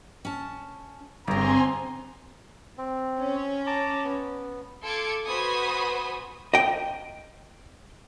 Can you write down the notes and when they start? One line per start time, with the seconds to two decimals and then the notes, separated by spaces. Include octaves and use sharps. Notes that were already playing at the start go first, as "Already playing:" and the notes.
0.25 C#4 A5
1.28 G1 G2 C#3 C4 G#5 A#5 C6
2.78 C4
3.19 C#4
3.67 A5 A#5 D6
4.04 B3
4.84 F4 A4 C6 D6 G#6 C#7
5.27 B3 F#4 C5 G#5 B5 D#6
6.54 D#5 G5